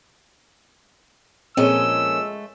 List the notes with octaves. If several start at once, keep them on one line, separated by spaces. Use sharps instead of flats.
A#2 F3 G#3 A3 C4 C#4 D#5 E6